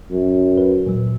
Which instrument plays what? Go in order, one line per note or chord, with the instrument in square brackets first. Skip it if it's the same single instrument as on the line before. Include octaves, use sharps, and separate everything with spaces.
[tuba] F#2
[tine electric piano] D2 B4
A#2 F#3